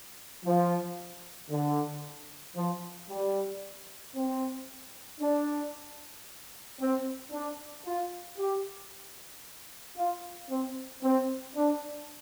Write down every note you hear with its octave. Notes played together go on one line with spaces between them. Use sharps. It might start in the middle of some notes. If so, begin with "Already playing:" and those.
F3
D3
F3
G3
C4
D4
C4
D4
F4
G4
F4
C4
C4
D4